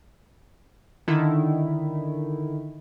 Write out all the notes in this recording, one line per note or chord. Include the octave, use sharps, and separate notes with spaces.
D3 D#3 E4